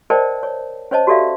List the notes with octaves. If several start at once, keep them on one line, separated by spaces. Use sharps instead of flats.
A#4 C5 D5 D#5 G5 A5
C#5
C#4 C5 C#5 D#5 A5
F#4 G4 A4 D5 E5 F5